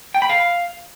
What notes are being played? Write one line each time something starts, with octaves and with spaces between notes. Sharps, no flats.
G5
B5
F5